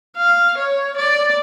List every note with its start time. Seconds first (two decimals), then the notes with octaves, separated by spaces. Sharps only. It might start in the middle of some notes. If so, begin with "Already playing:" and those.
0.17 F5
0.58 C#5
0.97 D5